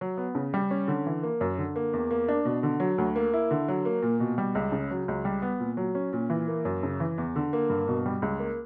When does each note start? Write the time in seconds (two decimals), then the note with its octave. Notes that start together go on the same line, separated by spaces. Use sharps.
0.01 F#3
0.17 B3
0.35 C#3
0.54 G3
0.71 C#4
0.88 D3
1.06 E3
1.23 A#3
1.41 F#2
1.58 D3
1.76 A#3
1.93 E2
2.11 A#3
2.29 D4
2.45 B2
2.63 D3
2.80 F#3
2.98 D2
3.16 A#3
3.33 E4
3.51 D3
3.68 F#3
3.85 A#3
4.03 A#2
4.20 B2
4.38 G3
4.55 C#2
4.72 C#3
4.91 F#3
5.08 C#2
5.25 G3
5.42 B3
5.60 A#2
5.77 F#3
5.95 C#4
6.13 A#2
6.30 E3
6.48 A#3
6.65 F#2
6.83 C#3
7.00 E3
7.18 E2
7.36 D3
7.53 A#3
7.70 G2
7.88 B2
8.06 G3
8.22 C#2
8.40 A#3